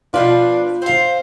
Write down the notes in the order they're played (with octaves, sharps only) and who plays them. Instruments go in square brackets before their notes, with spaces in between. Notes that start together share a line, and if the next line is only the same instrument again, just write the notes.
[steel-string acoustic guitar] B2 F3 B4 [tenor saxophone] D4 [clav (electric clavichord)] F4
[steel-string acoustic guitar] C4 F5 [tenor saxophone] C5